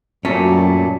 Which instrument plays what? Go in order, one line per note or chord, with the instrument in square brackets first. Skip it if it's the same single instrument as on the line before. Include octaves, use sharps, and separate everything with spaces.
[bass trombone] F#2 [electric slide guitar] A#2 A3 [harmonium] F#3 G3 [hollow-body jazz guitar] C#4